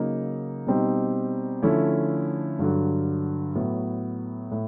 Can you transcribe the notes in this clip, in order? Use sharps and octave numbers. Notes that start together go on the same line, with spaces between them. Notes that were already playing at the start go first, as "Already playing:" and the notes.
Already playing: C#3 F#3 A#3 D#4
B2 G3 C4 D#4
D3 F3 A3 C#4 E4
G2 D3 F#3
A2 F#3 B3
A2